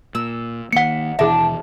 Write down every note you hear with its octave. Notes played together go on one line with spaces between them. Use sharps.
A#2 E6
D#3 A#3 F#5 C#7
D#2 B2 E3 D4 E4 G#4 E5